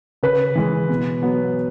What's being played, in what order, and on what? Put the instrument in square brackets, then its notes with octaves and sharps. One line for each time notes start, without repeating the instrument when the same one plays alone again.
[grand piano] C#3 B4
E3 G#3
B2
F#3 B3